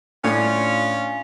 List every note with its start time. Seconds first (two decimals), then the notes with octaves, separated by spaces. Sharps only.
0.24 A2 C#4 D4 F4